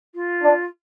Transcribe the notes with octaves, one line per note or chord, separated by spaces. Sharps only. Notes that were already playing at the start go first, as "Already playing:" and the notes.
F4
D4